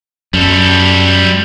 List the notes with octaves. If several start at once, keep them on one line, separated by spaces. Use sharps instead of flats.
F#2 G3 A4